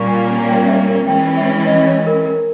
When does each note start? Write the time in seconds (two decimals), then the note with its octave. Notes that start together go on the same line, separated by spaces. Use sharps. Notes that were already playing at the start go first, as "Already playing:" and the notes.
Already playing: A#2 G3 A#3 C#4 C#6
0.08 G#5
0.28 G#5
0.48 G5
0.68 E5
0.88 A#4
1.07 E3 G#3 C#4 G5
1.37 E5
1.66 D#5
1.87 C#5
2.07 A#4
2.26 A#4